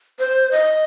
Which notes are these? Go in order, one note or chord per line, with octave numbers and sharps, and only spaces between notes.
C5
D#5